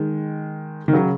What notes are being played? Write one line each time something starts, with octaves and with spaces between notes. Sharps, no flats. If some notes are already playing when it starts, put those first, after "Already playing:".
Already playing: D#3 G#3
D#3
C#3 F#3